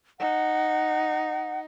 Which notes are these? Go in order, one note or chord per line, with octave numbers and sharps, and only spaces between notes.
D#4 F#5